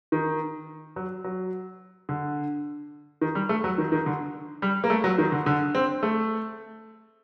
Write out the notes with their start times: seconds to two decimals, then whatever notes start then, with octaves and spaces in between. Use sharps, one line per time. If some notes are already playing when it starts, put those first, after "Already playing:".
0.12 D#3
0.96 F#3
1.24 F#3
2.09 D3
3.21 D#3
3.35 G3
3.49 A3
3.64 F#3
3.78 D#3
3.92 D#3
4.06 D3
4.62 G3
4.84 A#3
4.90 A3
5.04 F#3
5.18 D#3
5.32 D3
5.46 D3
5.75 C4
6.03 A3